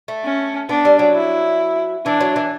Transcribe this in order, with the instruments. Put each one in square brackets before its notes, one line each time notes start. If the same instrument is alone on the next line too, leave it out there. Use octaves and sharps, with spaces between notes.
[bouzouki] A3
[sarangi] C#4
[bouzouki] B3 [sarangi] D4
[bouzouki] G3
F#3
[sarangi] E4
[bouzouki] E3 [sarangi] D4
[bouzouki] F#3
E3